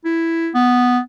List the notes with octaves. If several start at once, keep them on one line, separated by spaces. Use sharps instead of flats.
E4
B3